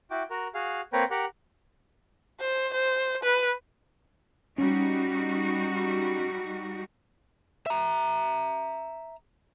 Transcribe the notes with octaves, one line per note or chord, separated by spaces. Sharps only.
E4 F#4 G5 D6
F#4 A#4
F#4 G#4 F5
A#3 C4 B4 C#5 G5 A#5
G4 A#4 F#5
C5
C5
B4
G3 C#4 D#4 F#4
E5 A#5